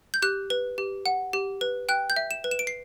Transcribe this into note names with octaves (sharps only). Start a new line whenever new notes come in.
G6
G4 F#6
B4
G4
F#5
G4
B4
G5 F#6
G6
E5
E7
B4
E7
D7
C7